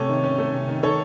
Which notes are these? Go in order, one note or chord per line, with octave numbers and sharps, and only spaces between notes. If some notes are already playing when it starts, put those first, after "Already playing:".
Already playing: C3 A3 C#4 A4 C#5
D#3
C#4
A3
C3
D#3
D#3 A4 C#5